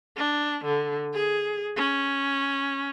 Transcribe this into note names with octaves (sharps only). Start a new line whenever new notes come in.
D4
D3
G#4
C#4